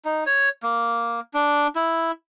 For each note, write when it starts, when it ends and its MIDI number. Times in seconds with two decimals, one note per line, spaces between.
0.05 0.24 63
0.26 0.49 73
0.63 1.20 58
1.34 1.67 62
1.76 2.11 64